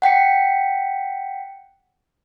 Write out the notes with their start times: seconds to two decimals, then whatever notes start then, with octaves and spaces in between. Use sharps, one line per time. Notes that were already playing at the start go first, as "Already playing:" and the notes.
0.02 F#5 G5 B6 C#7